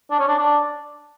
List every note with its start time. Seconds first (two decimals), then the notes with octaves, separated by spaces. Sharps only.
0.11 D4
0.19 C#4
0.28 D4
0.38 D4